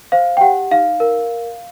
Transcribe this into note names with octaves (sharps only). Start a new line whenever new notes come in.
C5 F5
G5
G4 F#5
D#4 F5
A#4